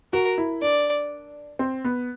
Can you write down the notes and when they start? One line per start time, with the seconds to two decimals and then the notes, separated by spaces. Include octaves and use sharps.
0.13 F#4 A#4
0.38 E4
0.62 D4 D5
1.59 C4
1.85 B3